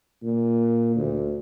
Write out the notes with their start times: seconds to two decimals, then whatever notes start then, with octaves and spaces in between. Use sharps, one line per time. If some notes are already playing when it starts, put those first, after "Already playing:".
0.23 A#2
0.96 D2